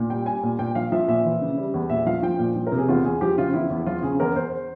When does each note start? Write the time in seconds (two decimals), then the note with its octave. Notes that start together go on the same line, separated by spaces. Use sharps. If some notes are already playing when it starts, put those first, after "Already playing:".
Already playing: A#2
0.10 G3 G5
0.26 G3 G#5
0.43 A#2
0.59 A#2 G5
0.75 F3 F5
0.92 F3 E5
1.08 A#2 E5
1.25 E3
1.41 C#3
1.58 G3
1.74 E2
1.90 A#2 E5
2.06 F3 F5
2.22 F3 G5
2.39 A#2
2.56 F3
2.67 A#4
2.72 C3
2.78 G#4
2.89 E2 F4
3.04 E2 G#4
3.21 F3 G4
3.38 C#3 F4
3.54 E2 E4
3.70 E2
3.86 F3 F4
4.03 C#3 G#4
4.20 E2 A#4
4.36 E2 C5